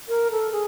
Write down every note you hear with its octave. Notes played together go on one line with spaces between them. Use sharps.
A#4
A4
G#4